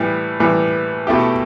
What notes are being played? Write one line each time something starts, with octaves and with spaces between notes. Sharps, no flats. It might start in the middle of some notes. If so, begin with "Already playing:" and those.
Already playing: A2 E3 G3
A2 E3 G3
B2 A3 E4 G4